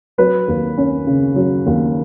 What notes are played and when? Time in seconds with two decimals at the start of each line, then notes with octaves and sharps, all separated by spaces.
0.18 F#3 B4
0.48 D#2
0.78 C#4
1.07 C#3
1.36 F#3
1.66 D#2